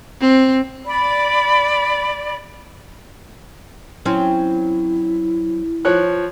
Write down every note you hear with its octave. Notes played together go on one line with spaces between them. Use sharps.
C4
D5 B5
F#3 C4 C#4 E4
F3 C#5 F#6